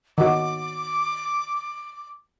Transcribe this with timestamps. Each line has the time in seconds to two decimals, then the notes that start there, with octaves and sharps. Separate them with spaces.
0.18 D#3 F#4 D6